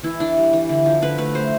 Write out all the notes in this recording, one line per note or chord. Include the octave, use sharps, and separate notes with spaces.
E3 E4
E3 D4
G3
E3
D3
F3
D3 B4
A3 B4
A3 C5